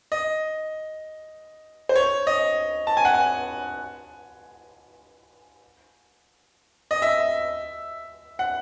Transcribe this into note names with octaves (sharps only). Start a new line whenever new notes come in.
D#5
C5
C#5
D#5
A5
G#5
F#5
G#5
D#5
E5
F#5